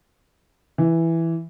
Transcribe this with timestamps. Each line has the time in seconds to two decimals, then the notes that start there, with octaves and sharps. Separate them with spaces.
0.78 E3